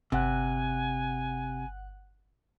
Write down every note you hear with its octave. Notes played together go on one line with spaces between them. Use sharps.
G1 C3 F#5 G#5 F#6